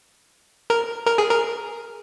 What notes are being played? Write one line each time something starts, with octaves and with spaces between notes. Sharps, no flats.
A#4
A#4
G#4
A#4